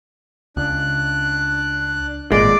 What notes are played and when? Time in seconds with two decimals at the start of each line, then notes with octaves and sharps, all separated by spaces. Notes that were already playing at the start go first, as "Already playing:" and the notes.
0.57 C#2 D4 F#6
2.32 G#1 A#2 G#3 D5